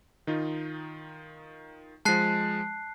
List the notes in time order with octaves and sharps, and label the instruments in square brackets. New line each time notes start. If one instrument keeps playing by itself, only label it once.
[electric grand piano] D#3 D#4 F4
[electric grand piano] F3 G#3 [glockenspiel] A5 F#6 C7